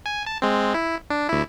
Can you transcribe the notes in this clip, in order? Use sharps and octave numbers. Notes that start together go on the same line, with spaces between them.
G#5
A5
G#3 C4
E4
D4
D2 E4